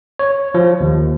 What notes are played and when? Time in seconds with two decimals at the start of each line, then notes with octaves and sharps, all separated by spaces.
0.19 C#5
0.54 F3
0.81 D#2